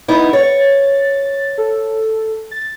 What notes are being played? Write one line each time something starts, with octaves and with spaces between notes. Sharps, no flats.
B3 D#4 E4
C#5 A6
A6
A4
A6